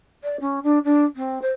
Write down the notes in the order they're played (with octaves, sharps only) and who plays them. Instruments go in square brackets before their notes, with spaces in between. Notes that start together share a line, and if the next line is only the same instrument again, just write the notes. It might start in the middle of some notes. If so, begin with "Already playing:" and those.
[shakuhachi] D5
C#4
D4
D4
C4
C5